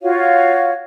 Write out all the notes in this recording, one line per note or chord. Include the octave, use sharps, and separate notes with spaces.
F4 F#4 C#5 F5